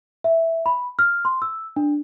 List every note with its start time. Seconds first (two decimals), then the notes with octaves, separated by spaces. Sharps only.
0.24 E5
0.66 B5
0.99 F6
1.25 C6
1.42 E6
1.76 D4